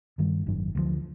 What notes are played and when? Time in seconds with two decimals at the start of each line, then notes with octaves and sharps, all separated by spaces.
0.18 G2 D#3 G3
0.46 G#1 F#2 D#3
0.75 D2 D3 F3